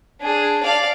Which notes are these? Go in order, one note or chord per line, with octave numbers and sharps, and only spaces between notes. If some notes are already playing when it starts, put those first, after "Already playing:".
D4 G#4
D5 F5